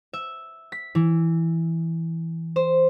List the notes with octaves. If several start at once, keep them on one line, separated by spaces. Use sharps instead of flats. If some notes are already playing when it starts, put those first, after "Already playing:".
E5
B6
E3
C5